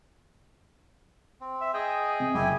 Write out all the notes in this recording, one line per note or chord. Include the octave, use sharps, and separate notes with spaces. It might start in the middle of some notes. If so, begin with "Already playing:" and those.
C4
E5
G#4 D#5 G5
C3
F#1 E4 G4 G#5